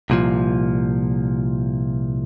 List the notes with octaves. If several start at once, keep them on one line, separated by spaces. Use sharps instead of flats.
C2 A#2 F3